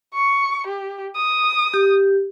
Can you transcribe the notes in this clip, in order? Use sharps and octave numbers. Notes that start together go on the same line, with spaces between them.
C#6
G4
D#6
G4